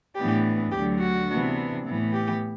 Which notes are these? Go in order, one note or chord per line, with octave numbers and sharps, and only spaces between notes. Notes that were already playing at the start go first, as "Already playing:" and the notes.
A2 E3 B3 D4 G4
D2 D3 F#3 G4
F#4
C3 E3 B3 D4
A2 E3 B3
G4